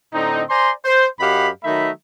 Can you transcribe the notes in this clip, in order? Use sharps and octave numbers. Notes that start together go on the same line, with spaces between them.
A2 D3 C4 D#4
C5 D5 G#5 A#5 C6
C5
F#2 G4 D#5 F5 F#5 B5
D#3 F#3 A3 D#4 E5 B5